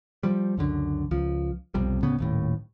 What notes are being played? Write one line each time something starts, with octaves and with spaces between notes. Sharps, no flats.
F3 G3
C#2 F#2 D3
C#2 F3
B1 F2 C3 G3
D2 A2 C#3 B3
D#1 D#2 A2